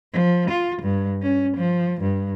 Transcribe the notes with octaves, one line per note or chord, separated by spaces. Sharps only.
F3
F4
G2
C#4
F3
G2